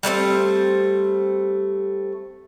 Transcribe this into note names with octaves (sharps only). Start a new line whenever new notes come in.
G3 A3 B3 C4